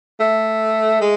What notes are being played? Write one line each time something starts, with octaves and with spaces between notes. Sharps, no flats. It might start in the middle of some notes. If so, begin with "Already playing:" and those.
A3
G#3